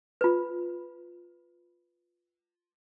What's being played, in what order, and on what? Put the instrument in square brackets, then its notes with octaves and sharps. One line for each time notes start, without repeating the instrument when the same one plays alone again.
[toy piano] F4 B4